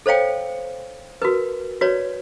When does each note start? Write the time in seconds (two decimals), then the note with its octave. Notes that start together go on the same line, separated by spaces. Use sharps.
0.06 A4 C5 C#5 F5 G5
1.22 F#4 A#4 B4
1.81 F#4 B4 C#5 D5